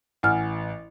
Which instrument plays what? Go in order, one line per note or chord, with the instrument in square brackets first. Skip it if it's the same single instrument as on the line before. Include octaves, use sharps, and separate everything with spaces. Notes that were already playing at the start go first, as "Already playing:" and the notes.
[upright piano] A1 [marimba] F#5 G#5 F6